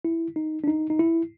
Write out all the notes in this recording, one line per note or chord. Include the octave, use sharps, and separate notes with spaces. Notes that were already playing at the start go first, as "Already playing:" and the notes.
E4
D#4
D4
D#4
D#4
E4